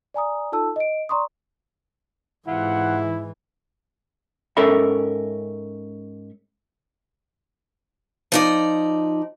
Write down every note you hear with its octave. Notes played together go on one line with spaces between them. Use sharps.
D5 G#5 A#5 D#6
D#4 F4 A4 A5 E6
D#5 D7
D5 A#5 C6 C#6 D#6
G#2 C3 E3 E4 F4 F#5
G#2 C#4 A4 A#4 E5 B5
F3 D#4 D5